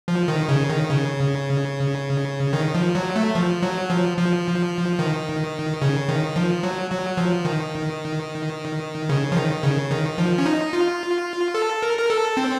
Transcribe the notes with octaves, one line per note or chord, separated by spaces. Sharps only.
F3
D#3
C#3
D#3
C#3
D#3
F3
F#3
A3
F3
F#3
F3
F3
D#3
C#3
D#3
F3
F#3
F#3
F3
D#3
C#3
F3
D#3
C#3
D#3
F3
C#4
D#4
F4
A4
A#4
A#4
A4
C4